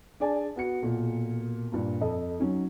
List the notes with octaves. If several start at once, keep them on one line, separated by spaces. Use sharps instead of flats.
D4 G#4 D5 G#5 A5
B3 F#4 C#7
B1 A#2
G2 A#2
F2 A4 D#5
F#3 C#4 D#4